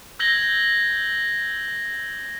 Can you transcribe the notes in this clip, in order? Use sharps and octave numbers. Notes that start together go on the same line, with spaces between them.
E6 G6 G#6 A#6 F#7 G7